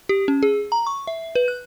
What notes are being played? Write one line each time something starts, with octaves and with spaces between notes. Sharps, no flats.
G4
C#4
G#4
A#5
C#6
E5
B4
F#6